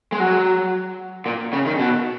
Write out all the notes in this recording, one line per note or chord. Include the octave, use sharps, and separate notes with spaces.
G#3
F#3
A#2
C#3
D#3
B2